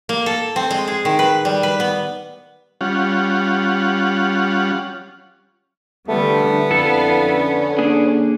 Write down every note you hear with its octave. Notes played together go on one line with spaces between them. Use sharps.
A#3
A4
C4
G#3
G#4
D#3
B4
G3
B4
B3
G3 C#4 F4 F#5
D3 E3 G3 A3 B3
F2 D3 E4 A4 F5
C#4
A#3 D4 G#4